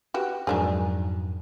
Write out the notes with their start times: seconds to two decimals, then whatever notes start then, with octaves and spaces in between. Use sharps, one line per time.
0.14 F#4 G4 B4
0.47 F2 G#2 D#3 F#3 D4 G#4